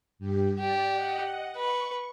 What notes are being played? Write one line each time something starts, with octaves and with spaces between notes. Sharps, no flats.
G2 G4
G4 D5
D#5 F#5
B4 C#6